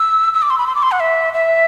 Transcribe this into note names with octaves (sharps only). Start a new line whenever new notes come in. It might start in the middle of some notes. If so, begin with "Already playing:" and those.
Already playing: E6
E6
D6
C6
B5
C6
D6
C6
F#5
E5
E5